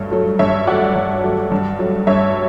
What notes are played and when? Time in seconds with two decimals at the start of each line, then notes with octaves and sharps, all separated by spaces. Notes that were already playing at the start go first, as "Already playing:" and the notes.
Already playing: G2 F#3 A3 C#5
0.12 F#3 A3
0.39 G2 C#5 E5
0.67 F#3 A3 D5 F#5
0.95 G2
1.24 F#3 A3
1.51 G2
1.79 F#3 A3
2.07 G2 C#5 E5